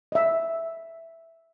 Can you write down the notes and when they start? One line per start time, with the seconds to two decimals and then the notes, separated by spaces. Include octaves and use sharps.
0.12 D#5 E5